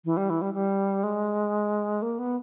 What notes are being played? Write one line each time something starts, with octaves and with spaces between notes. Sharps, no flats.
E3
G3
E3
G3
G3
G#3
A#3
B3